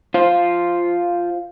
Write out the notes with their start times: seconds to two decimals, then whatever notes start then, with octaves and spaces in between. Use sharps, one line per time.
0.14 F4 C5